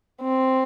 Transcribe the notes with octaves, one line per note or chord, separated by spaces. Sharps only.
C4